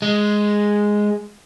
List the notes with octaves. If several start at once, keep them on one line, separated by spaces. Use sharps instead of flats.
G#3